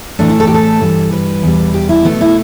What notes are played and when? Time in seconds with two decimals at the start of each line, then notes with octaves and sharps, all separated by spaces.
0.19 A2 E3 A3 D4
0.29 E4
0.40 A4
0.47 G4
0.54 A4
0.81 G2 E3 G3
1.12 B4
1.43 E2 B2 G3
1.74 G4
1.89 E4
2.05 B2 A3 B3
2.21 E4